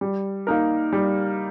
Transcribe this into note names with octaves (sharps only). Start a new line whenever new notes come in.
G3
A#3 D#4 A#4
G3